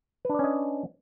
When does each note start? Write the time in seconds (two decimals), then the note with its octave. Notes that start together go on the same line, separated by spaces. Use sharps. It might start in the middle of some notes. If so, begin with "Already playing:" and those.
0.25 B4
0.30 D4
0.34 D5
0.39 C#4
0.44 D#5